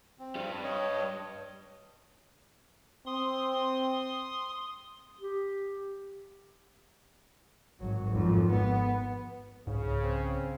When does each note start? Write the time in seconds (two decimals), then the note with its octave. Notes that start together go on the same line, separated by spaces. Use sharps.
0.19 C4
0.35 G2 G3
0.64 C#5 D#5
3.07 C4 C6 D#6
5.21 G4
7.80 G#1 F#3
8.11 G#1 F2
8.50 B3
9.67 C2 G#2 C#3
10.03 C4